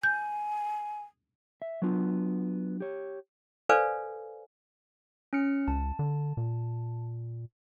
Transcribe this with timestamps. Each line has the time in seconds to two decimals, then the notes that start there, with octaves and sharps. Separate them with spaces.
0.03 G#5 G6
1.62 E5
1.82 F#3 B3 D4 F4
2.80 G4 C#5
3.69 A4 B4 C5 D5 F5 G#5
5.33 C#4 F6 C#7
5.68 C#2 A5
5.99 D3
6.37 A#2